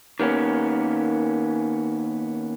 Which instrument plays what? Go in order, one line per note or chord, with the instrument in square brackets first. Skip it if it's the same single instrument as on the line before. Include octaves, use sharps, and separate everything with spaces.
[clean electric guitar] D#3 A#3 B3 C#4